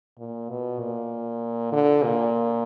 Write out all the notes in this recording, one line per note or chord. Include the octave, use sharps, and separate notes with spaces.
A#2
B2
A#2
D3
A#2